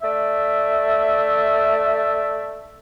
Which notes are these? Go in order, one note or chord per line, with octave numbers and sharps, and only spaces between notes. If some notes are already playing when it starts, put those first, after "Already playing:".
A3 D5 E5